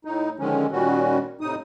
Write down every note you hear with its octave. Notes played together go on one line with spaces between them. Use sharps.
A2 D#4
D3 D#3 F3 G#3 C#4
A#2 D#3 G3 C#4 F#4
A2 C3 D#4 D#6